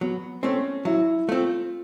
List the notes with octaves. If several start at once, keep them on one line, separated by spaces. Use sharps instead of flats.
F#3 B3
A3 C4 C#4
F#3 E4
A3 C4 F4